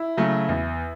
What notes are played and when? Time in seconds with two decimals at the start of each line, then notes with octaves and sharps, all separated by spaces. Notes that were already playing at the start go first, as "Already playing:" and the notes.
Already playing: E4
0.17 C#3 F#3 A3
0.49 E2